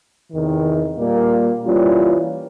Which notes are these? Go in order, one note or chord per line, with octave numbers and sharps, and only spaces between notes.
E2 C3 D#3
A#2 G3 A#3
E3 G3 A#3 C#4 F4